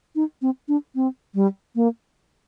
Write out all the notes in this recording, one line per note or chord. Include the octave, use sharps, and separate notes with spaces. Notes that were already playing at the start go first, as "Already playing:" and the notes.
D#4
C4
D4
C4
G3
A#3